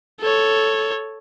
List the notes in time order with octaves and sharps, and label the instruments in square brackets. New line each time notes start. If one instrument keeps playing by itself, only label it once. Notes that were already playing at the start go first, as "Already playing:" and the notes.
[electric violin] A4 C#5